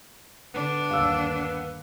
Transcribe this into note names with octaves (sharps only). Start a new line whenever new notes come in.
D3 B3 D4
G1 D#2 F5 E6